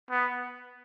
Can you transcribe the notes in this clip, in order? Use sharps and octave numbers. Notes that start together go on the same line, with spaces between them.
B3